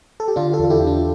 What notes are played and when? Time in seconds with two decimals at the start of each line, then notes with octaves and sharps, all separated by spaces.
0.20 A4
0.28 G4
0.36 D3 D4 F4
0.53 F4 A4
0.59 E2
0.64 A4
0.70 E4 G4
0.81 D3
0.87 D4 F4